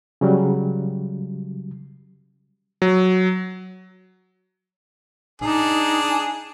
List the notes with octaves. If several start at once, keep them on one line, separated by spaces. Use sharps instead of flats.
C#3 F#3 G3
F#3
D4 D#4 G#4